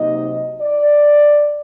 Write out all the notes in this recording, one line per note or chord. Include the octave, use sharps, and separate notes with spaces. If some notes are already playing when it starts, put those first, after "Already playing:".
Already playing: C3 F#3 A#3 D#4 D#5
D5